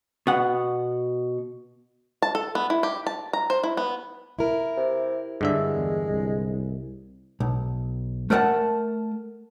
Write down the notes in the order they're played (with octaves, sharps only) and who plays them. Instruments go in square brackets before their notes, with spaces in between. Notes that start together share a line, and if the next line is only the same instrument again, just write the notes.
[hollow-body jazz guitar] B2 F#5
[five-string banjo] A5
A4
B3
E4
G4
A5
A#5
C5
E4
B3
[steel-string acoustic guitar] E4 A#4
[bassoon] C3
[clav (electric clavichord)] G2 D3 E5 [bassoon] G#3
[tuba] E2
C2
[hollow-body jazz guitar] B1
A3 A#4 B4 D5 F#5 A5